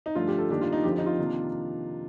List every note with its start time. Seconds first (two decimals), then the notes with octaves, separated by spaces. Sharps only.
0.06 D#4
0.15 G2 D3 F3 A3 F4
0.27 G4
0.38 A4
0.50 G2 D#3 A#3 D4 G4
0.61 F4
0.73 D#4
0.83 F2 D3 F3 C4 G4
0.91 F4
0.98 D#4
1.06 F4
1.19 C3 D#3 A#3 D4